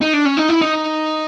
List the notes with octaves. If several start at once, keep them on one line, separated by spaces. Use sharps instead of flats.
D#4
D4
C#4
D#4
E4
D#4